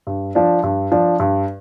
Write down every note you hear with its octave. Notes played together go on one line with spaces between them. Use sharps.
G2
F3 D4
G2
F3 D4
G2